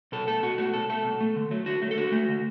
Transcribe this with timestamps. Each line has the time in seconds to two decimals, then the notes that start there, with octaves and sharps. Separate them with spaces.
0.12 B2 A4
0.27 A3 A4
0.42 B2 F#4
0.58 A3 F#4
0.74 B2 A4
0.90 A3 A4
1.05 B2
1.20 A3
1.36 D3
1.51 F#3 A3
1.66 D3 F#4
1.82 F#3 A3
1.91 A4
1.97 D3 F#4
2.12 A3
2.29 D3